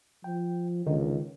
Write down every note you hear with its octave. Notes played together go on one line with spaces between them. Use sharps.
F3 G5
C#2 D3 D#3 D#4